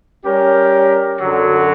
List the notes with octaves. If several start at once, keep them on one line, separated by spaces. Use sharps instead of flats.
G3 C#4 G4 A#4
F#2 D3 F#3